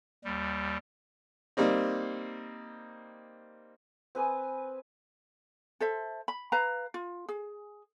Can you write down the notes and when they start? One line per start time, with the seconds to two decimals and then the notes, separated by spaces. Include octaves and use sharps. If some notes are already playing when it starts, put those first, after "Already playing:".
0.24 D#2 G3
1.57 G3 A#3 C4 D#4
4.15 C4 B4 G#5 D#6
5.80 A4 C5 E5
6.28 B5
6.52 B4 F5 A#5
6.94 F4
7.29 G#4